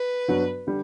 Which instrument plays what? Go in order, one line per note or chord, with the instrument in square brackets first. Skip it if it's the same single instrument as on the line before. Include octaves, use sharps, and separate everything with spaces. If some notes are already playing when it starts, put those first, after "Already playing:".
Already playing: [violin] B4
[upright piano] G2 F#3 B3 F#4
D3 G3